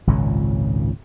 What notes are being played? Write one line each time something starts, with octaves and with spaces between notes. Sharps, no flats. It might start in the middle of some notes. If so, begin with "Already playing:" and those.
G#1 C#2 A#2 C#3